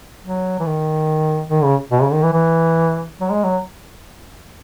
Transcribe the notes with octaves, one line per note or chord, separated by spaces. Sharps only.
F#3
E3
D#3
D#3
C#3
B2
C#3
D#3
E3
E3
F#3
G#3
F#3